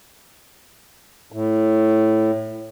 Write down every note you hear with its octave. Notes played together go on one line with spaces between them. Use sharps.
A2